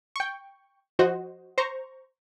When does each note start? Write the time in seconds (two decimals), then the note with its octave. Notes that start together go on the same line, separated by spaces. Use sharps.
0.16 G5 C#6
0.99 F3 F#4 C5 D#5
1.58 C5 A#5 C#6